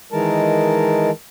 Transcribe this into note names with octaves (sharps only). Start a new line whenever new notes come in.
D#3 E3 G#3 A#4 A5